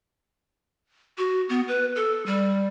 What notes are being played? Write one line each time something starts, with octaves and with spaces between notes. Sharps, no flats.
F#4
B3
B4
A4
G3